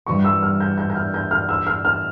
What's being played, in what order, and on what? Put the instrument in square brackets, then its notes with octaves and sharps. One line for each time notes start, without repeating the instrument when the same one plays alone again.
[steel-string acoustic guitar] G2 E3 G3 [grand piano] C#6
[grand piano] E6
F6
G6
G6
G6
F6
G6
F6
E6
F6
F6